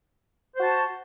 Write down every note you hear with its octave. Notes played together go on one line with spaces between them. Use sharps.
F#4 C5 A5